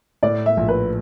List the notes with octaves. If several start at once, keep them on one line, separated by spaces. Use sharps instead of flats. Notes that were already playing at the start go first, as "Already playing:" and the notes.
A2 D5
E5
A#1
B4